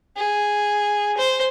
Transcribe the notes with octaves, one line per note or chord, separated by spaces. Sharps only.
G#4
C5